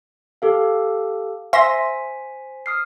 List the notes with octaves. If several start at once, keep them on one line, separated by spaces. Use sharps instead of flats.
G4 A4 F5
C5 E5 G#5 C6 A#6 B6
D#6 F6 C7